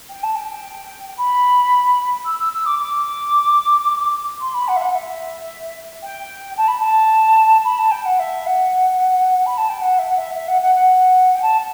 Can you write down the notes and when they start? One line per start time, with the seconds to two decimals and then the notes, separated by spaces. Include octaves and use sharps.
0.09 G5
0.23 A5
0.35 G5
1.17 B5
2.25 E6
2.39 E6
2.53 E6
2.66 D6
2.79 D6
4.40 C6
4.54 B5
4.68 F#5
4.76 E5
4.81 F#5
4.95 E5
6.03 G5
6.57 A5
6.67 B5
6.80 A5
7.64 B5
7.78 A5
7.91 G5
8.05 F#5
8.19 E5
8.46 F#5
9.46 B5
9.57 A5
9.69 G5
9.81 F#5
9.98 E5
10.09 F#5
10.17 E5
10.34 E5
10.48 F#5
10.61 F#5
10.74 F#5
11.35 G5
11.42 A5